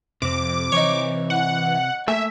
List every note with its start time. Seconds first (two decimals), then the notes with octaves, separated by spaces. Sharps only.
0.22 F2 C3 C4 D6
0.72 E3 D#4 C#5
1.30 F#5
2.08 A3 A#3 E5 G#5